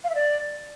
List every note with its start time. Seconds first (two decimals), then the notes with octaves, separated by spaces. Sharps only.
0.04 F5
0.09 E5
0.15 D5